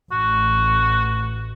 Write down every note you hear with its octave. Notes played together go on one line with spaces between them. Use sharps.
A1 F#4